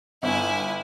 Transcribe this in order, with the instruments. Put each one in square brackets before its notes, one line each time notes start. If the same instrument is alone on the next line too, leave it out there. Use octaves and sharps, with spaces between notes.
[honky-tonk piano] G1 [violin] E4 G#5